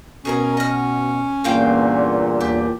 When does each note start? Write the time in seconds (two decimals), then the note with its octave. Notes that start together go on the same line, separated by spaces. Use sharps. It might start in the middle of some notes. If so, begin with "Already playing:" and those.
0.25 B2 C#4 G#4 A#4 A#5
0.57 D#5 F6
1.44 E2 G2 A#2 C5 F5 G5
2.41 D#2 G4